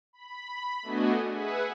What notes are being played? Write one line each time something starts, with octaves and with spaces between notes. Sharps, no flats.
B5
A3 B3 D4 F#4 D#5 G#5
G#4 B4 E5 F#5 G#5